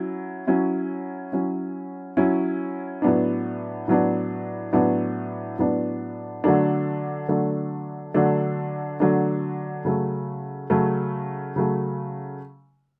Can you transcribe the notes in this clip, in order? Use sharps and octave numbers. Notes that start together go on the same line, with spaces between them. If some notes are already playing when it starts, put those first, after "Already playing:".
Already playing: F#3 C#4 E4
F#3 C#4 E4
F#3 C#4 E4
F#3 C#4 E4
A2 F#3 B3 D4
A2 F#3 B3 D4
A2 F#3 B3 D4
A2 F#3 B3 D4
D3 F#3 A3 D4
D3 F#3 A3 D4
D3 F#3 A3 D4
D3 F#3 A3 D4
C#3 F#3 A3
C#3 F#3 A3
C#3 F#3 A3